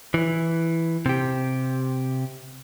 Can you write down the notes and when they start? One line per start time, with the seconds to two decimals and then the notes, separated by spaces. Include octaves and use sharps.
0.14 E3
1.06 C3 G4